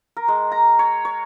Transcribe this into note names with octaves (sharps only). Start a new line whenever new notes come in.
A#4
G#3
A#5
C#5
C#5